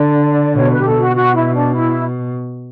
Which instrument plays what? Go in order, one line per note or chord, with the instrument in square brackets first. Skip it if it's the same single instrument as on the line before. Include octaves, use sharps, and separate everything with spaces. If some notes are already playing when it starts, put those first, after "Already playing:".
Already playing: [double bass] D3 [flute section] D5
[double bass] B2 [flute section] C#5
[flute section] B4
G4
[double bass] B2 [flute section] A4
[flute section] F#4
F#4
E4
D4
E4